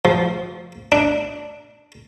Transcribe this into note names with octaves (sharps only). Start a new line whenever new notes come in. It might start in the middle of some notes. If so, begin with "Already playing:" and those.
F3
D4